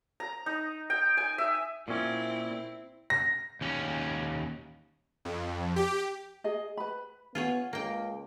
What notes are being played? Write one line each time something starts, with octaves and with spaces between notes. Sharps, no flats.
A#5
D#4
G5
G#5
E5
A#2 C4 C#4 E4
A#6
D#2 C#4
F2
G4
G#4 D#5
B4 B5
B3 F4 G#4 C#5
C#2 A#3 G5